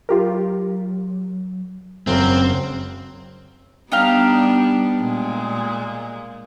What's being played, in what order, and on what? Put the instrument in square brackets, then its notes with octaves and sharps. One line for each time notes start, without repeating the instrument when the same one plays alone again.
[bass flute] F#3 [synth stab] F4 G4 A#4
[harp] F#1 F#2 [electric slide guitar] C4
[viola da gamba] G3 B3 D4 [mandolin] D#4 G4 F5
[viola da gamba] A#2 G#3